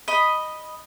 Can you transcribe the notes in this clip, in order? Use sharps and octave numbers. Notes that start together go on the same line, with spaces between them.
D#5 B5